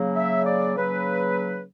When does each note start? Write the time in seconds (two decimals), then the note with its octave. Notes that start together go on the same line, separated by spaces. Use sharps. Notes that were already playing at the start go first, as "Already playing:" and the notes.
Already playing: C#3 F#3 A#3
0.15 E5
0.45 D5
0.76 C#3 F#3 A#3 B4